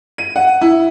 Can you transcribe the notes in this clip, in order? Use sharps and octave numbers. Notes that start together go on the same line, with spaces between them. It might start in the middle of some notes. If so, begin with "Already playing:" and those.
D#7
F#5
E4